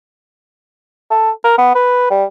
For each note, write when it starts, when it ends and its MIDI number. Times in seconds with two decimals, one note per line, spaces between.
1.10 1.31 69
1.44 1.58 70
1.58 1.75 59
1.75 2.10 71
2.10 2.24 55